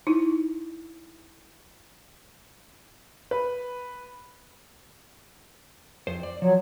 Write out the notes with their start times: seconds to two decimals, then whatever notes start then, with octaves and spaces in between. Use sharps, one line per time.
0.07 D#4 E4
3.31 B4
6.07 F2 C5
6.23 D5
6.42 F3 F#3